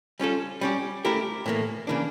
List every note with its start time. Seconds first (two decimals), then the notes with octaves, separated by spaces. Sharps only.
0.20 G3 C#4 F4 A4
0.61 G3 C#4 G4
1.05 A3 E4 G4 A#4
1.46 A2 E3 A#3
1.87 C#3 E3 A#3 D4